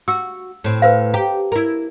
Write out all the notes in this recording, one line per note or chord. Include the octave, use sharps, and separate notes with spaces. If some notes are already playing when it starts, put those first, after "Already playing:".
F#4 E6
A2 C4
B4 C5 F5
G4 A#5
E4 A#4